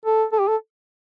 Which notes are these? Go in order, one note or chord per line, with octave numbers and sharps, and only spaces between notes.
A4
A4
G4
A4